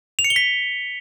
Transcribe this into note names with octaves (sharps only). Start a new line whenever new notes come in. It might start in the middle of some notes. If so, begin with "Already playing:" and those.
F7
C#7
G7
B6